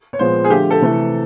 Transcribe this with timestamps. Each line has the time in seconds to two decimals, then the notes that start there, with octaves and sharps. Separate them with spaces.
0.13 C#5
0.19 A#2 F3 G#3 B3 C5
0.44 G#4
0.50 D3 F3 A3 G4
0.70 A4
0.80 C3 E3 A3